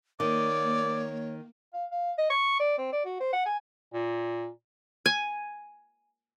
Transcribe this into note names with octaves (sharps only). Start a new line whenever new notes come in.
D#3 A#3 C#5 D5
F5
F5
D#5
C#6
D5
C4
D5
F#4
C5
F#5
G#5
A#2
G#5